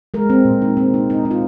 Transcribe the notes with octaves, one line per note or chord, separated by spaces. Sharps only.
G#3 A#4
C4
A#2
D#4
C4
D#4
D#4
D#4
F4